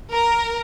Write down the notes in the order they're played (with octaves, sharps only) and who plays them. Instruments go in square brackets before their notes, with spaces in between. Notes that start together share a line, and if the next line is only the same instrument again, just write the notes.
[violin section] A#4